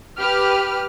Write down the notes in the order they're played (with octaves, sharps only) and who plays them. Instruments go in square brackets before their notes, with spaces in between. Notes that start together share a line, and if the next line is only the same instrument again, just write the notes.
[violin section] G4 B4 F6